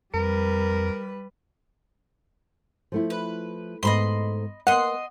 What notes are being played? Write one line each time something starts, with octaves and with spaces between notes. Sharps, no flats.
F2 G3 A#4 B4
F3 A3 E4
B4
G#2 A3 B3 D#5 B5 C6
A#3 B3 D#5 F#5 C6